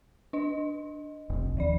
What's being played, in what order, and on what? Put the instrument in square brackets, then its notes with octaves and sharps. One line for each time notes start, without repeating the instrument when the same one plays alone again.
[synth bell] D4 D#5
[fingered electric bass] F1 C2
[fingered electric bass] D#2 [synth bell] D#3 F3 D5